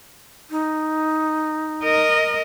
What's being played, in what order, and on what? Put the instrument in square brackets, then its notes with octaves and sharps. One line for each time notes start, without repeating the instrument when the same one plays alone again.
[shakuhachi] D#4
[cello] A#4 D#5